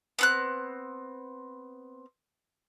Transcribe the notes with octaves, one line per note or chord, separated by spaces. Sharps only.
B3 C4 F#6